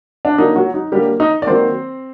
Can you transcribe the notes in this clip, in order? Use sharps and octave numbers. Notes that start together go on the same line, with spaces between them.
D4
D3 F#3 A#3 D#4
F#3 F#4
D#4
D3 F#3 G3 A#3 G4
D#4 D#5
D5
D#3 F#3 A#3 C4 C5